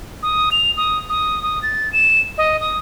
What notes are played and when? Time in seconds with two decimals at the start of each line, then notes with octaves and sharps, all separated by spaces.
0.23 D#6
0.52 F7
0.77 D#6
1.09 D#6
1.43 D#6
1.63 A6
1.93 E7
2.38 D#5
2.61 D#6